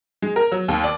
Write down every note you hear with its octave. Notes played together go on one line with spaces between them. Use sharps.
G#3
A#4
F#3
D#2
D5